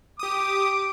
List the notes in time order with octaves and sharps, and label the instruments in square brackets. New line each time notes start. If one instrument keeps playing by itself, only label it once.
[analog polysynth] G4 D#6 [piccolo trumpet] D6